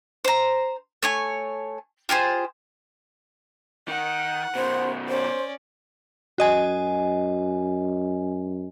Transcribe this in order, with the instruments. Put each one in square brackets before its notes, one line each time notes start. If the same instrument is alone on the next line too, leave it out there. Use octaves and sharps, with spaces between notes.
[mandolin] C5 A#5
A3 C#5 G#5
F4 G4 G#4 C5
[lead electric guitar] D#3 [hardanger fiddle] F#5
[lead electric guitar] B2 D#3 [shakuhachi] C5
[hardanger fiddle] C#4 D5 [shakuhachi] C5
[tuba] F#2 [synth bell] F#4 D#5 G#5